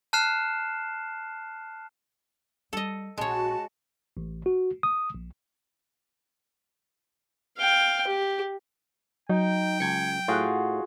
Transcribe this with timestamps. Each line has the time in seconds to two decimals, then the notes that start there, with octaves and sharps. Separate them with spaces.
0.13 A5 F6 F#6 C7 E7
2.73 G3 A4 D#5
3.18 A#1 G#3 F#4 C#5 A5
4.17 A1
4.46 F#4
4.83 D#6
5.14 A#1
7.59 F5 G5
8.08 G4
9.29 F#3 D#4 G5
9.80 C#2 G#6 C#7
10.28 A2 F4 F#4 G#4 F#5